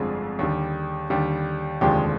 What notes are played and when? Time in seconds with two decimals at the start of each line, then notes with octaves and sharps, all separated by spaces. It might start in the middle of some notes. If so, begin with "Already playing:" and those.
Already playing: G1 F2 D3 F3 G#3 G#4
0.39 D#2 D3 G3
1.10 D#2 D3 G3
1.81 F1 D#2 D3 F3 G#3 G4